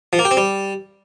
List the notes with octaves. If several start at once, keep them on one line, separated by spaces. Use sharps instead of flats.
F3
A#3
G4
C4
G3